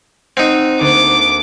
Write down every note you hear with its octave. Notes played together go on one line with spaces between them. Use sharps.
C4 D#4 F#5
D2 A#3 D6 A6